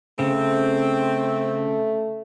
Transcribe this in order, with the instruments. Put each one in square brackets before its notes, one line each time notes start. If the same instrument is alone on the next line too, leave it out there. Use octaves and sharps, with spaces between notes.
[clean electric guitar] C#3 [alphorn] A3 [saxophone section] C4